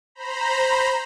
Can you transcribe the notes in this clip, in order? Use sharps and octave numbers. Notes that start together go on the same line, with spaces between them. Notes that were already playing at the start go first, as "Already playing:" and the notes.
C5 A#5 B5